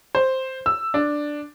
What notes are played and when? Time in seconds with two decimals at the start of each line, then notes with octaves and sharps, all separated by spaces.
0.15 C5
0.66 E6
0.94 D4